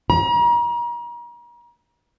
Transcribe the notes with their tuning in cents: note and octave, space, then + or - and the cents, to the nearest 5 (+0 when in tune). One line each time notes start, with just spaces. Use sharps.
A#5 +35